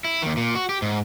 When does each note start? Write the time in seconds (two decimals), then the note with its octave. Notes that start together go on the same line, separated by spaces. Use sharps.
0.04 E4
0.22 D#2 D#3
0.37 A#2
0.55 F#4
0.69 G4
0.82 G#2